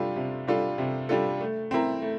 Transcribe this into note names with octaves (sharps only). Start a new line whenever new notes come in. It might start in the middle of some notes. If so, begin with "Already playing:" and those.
Already playing: C3 G3 D4 F4 A4
C3
G3 D4 F4 A4
C3
G3 D4 F4 A4
A3
C4 E4 A#4
A3